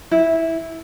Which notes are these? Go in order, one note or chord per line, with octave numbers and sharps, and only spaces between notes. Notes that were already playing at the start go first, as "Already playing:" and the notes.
E4